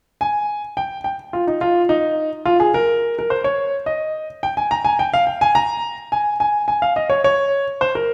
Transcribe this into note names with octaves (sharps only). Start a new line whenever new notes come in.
G#5
G5
G5
F4
D#4
F4
D#4
F4
G#4
A#4
A#4
C5
C#5
D#5
G5
G#5
A#5
G#5
G5
F5
G5
G#5
A#5
G#5
G#5
G#5
F5
D#5
C#5
C#5
C5
A#4